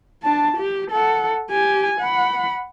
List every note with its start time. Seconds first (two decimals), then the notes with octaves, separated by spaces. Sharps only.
0.23 D4 A5
0.57 G4
0.91 A4 F#5
1.51 G4 G#5
2.00 F#5 B5